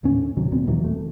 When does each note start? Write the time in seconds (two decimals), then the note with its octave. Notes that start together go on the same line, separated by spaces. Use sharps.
0.03 D#2 A2 D3 C#4
0.37 D#2 C3 D#3 F#3
0.51 D#2 A#2 B3 C4
0.67 D#2 D#3 E3 F#3
0.82 E1 A3